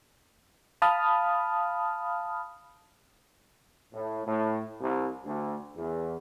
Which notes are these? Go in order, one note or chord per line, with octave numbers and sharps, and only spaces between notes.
F5 A5 B5 D#6 F6
A2
A2
C2
D2
E2